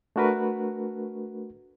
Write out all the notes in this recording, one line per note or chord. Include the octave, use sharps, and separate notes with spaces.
A3 D4 F#4 A#4 B4